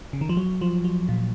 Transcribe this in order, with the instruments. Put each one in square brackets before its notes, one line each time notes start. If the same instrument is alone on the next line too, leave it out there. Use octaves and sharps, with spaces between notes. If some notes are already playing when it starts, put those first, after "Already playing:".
[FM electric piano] C#3
D#3
F3
F#3
F3
F#3
A#2